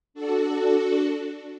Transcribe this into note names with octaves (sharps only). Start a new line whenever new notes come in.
D4 F#4 A4